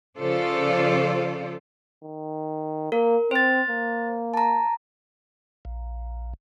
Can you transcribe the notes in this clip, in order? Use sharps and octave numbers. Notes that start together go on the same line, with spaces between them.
C#3 F3 F4 A4 C5 D5
D#3
A#3 A#4
C4 C5 A6
A#3
A5 A#5
A#1